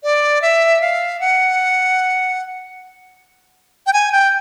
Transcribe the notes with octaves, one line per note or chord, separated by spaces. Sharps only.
D5
E5
F5
F#5
G5
G#5
G5